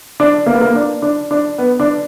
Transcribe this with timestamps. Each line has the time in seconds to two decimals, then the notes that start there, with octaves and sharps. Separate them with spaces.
0.20 D4
0.46 A#3
0.54 B3
0.61 A#3
0.75 D4
1.02 D4
1.31 D4
1.58 B3
1.80 D4